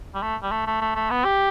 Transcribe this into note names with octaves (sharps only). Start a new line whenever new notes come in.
G3
A3
G3
A3
A3
A3
A3
B3
G4